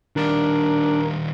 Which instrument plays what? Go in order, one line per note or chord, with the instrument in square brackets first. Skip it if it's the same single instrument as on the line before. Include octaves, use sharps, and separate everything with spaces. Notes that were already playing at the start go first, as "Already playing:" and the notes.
[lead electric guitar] D#3 G3 [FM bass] D4 [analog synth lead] A#4